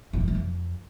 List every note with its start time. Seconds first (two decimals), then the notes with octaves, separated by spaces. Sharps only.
0.13 A#2
0.21 G#2
0.28 C3
0.35 F2